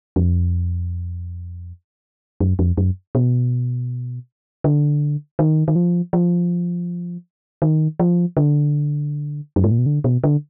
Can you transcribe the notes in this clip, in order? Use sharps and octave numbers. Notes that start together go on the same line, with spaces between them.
F2
F#2
F2
F#2
B2
D3
D#3
D#3
F3
F3
D#3
F3
D3
F#2
G#2
A#2
B2
D3
B2
D3